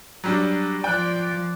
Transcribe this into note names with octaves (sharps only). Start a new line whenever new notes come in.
F#3 G3 D4
F3 D5 G5 F#6